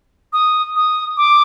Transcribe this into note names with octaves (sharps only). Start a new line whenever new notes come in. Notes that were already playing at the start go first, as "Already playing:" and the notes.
D#6
D#6
D6